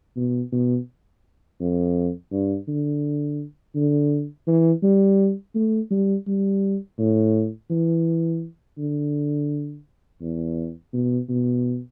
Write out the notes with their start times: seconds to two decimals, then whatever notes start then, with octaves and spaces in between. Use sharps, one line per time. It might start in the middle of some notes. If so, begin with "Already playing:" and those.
0.16 B2
0.52 B2
1.60 F2
2.31 G2
2.68 D3
3.76 D3
4.47 E3
4.83 G3
5.55 A3
5.91 G3
6.27 G3
6.99 A2
7.70 E3
8.78 D3
10.21 E2
10.94 B2
11.29 B2